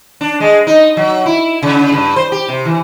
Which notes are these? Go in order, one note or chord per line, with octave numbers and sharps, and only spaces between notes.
D4
G#3
D#4
F#3
E4
C#3
G2
C5
G4
C3
E3